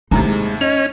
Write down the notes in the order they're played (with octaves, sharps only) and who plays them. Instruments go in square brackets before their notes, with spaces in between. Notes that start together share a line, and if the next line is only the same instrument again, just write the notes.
[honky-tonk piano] D#2 A2 C3 [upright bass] D#4 [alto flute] A#5
[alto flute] G#3
[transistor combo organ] C#4 [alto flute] D#5 [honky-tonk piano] F7